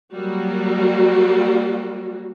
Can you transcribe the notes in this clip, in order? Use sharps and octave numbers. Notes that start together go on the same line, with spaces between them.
F#3 G3 A#3 F#4